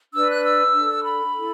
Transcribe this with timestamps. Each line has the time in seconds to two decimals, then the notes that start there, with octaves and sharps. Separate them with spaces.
0.14 D4 B4 E6
0.29 F#6
0.44 E6
0.74 D4 A4
1.03 B5
1.33 E4 A4